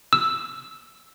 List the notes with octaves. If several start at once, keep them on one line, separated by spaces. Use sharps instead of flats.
E6